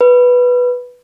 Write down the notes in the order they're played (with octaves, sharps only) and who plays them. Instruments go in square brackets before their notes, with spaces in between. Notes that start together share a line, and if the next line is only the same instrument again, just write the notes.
[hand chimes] B4